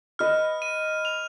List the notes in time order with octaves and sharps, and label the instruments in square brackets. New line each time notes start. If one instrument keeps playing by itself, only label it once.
[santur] B4 D#5 [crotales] F6
[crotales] D#7
F7